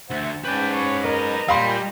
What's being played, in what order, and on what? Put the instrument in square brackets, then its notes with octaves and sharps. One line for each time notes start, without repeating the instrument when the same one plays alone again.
[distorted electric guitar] D2 [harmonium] C5 E5 F#5
[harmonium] G#2 C#4 [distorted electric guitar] B4 D5 [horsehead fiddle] G5 A5
[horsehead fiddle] C#5
[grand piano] A#4 [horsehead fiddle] D#5 A#5
[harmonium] A#2 G5 G#5 [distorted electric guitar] G3 [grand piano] F5 B5 C6